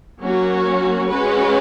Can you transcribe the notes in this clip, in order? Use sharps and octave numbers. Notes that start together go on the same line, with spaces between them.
F#3 A#3 C#4 F#4
G#3 C#4 F#4 B4